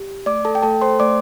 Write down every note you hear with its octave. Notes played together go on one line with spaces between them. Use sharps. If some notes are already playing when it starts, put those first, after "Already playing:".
Already playing: G4
A3 D5 D6
A4 A5
G5
A3 A4 A5
C5 C6
A3 D5 D6